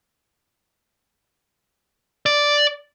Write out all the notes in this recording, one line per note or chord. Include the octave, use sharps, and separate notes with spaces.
D5